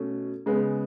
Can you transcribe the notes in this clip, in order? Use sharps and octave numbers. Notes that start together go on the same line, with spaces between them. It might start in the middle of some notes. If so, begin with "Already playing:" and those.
Already playing: B2 A3 C#4
C#3 G#3 B3